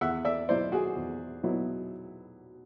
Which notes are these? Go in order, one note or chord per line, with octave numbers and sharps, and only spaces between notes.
E2 E5 F#5
D5 E5
B2 F#3 B3 E4 C5 D5
F#4 G#4
E2
B2 F#3 B3 E4